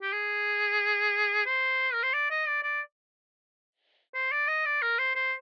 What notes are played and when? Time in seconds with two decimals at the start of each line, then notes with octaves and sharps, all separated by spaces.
0.02 G4
0.12 G#4
1.46 C5
1.93 A#4
2.03 C5
2.13 D5
2.31 D#5
2.47 D5
2.63 D5
4.14 C5
4.31 D5
4.48 D#5
4.66 D5
4.82 A#4
4.99 C5
5.15 C5